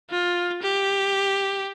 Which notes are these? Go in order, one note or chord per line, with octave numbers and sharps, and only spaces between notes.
F4
G4